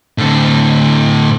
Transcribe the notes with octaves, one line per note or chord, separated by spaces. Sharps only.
A2 D3